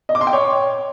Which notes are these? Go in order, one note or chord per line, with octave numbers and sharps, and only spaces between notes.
D#5
D6
C6
G5
C#5